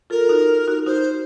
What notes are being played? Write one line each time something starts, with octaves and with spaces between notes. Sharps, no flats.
F4 A4 A#4
D#4 F#4
D#4 F#4
D#4 F#4 C5